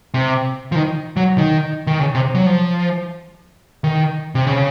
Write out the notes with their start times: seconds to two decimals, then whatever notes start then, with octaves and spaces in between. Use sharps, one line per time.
0.14 C3
0.72 F3
0.75 D#3
1.17 F#3
1.38 D#3
1.87 D#3
2.00 C#3
2.15 C3
2.35 F#3
2.46 F3
3.84 D#3
4.35 C3
4.47 C#3